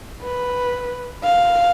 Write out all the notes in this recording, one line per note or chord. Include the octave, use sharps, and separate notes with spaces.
B4
F5